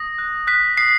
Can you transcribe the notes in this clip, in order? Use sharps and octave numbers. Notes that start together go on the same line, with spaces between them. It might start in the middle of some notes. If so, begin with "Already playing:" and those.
Already playing: D#6 A#6
F#6
F#6 B6
D#6 C7